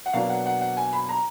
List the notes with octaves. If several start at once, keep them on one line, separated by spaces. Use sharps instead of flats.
F#5
B2 F#3 A#3 D4 F5
F#5
F#5
F#5
G#5
B5
A#5